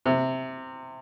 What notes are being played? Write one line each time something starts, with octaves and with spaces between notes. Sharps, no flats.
C3